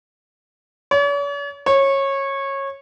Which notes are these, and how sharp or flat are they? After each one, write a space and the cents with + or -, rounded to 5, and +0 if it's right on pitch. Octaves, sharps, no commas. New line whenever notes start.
C#5 +45
C#5 -20